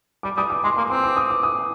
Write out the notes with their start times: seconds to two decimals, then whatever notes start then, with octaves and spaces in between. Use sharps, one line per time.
0.23 G3 D6
0.37 G3 D#6
0.50 D6
0.64 G#3 C6
0.77 A#3 C6
0.90 C4 C6
1.04 D6
1.17 D#6
1.30 D6
1.43 D#6